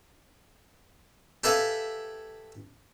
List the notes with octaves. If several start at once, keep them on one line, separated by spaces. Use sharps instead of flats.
G4 A4 B4 E5 F5 G#5